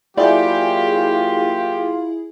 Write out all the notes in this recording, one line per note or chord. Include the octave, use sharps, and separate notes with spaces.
F#3 A#3 E4 F4 G4 G#4 D5